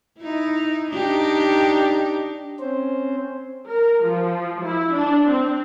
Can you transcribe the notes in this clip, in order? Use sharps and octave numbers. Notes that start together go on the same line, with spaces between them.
D#4 E4
D4 D#4 G4
C4 C#4 C5
A#4
F3
E4
D4
C4